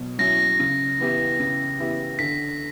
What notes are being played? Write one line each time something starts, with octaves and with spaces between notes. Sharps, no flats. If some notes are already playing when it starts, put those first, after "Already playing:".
Already playing: B2 F#3
F#3 C#4 E4 A#6
C#3
E3 B3 E4 G4
C#3
E3 B3 E4 G4
D3 B6